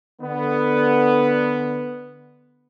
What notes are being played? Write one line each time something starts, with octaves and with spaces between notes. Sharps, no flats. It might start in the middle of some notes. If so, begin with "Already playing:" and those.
D3 B3